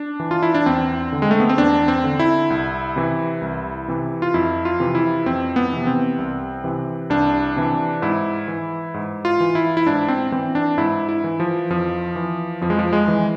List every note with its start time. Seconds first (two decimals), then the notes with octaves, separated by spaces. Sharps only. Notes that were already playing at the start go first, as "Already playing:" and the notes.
Already playing: D4
0.20 E3
0.31 F4
0.43 E4
0.54 D4
0.66 E2 C4
1.12 D3
1.22 G#3
1.31 A3
1.40 B3
1.49 C4
1.58 E2 D4
1.88 C4
2.04 D3
2.19 E4
2.50 C2
2.96 C3 E3
3.41 C2
3.88 C3 E3
4.22 F4
4.34 F2 E4
4.65 F4
4.80 C3 E3
4.95 E4
5.26 F2 C4
5.56 B3
5.73 C3 E3
5.87 C4
6.19 C2
6.64 C3 E3
7.10 C2 D4
7.56 C3 E3
8.02 G#2 E4
8.48 E3
8.94 G#2
9.25 F4
9.40 E3
9.55 E4
9.77 E4
9.86 G#2 D4
10.08 C4
10.32 E3 C4
10.55 D4
10.78 G#2 E4
11.09 E4
11.24 E3
11.40 F3
11.70 F2 F3
12.15 E3
12.61 F2 F3
12.70 G#3
12.79 F3
12.93 G#3
13.08 E3